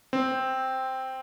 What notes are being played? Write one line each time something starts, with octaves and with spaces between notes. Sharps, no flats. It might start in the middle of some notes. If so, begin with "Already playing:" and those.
C4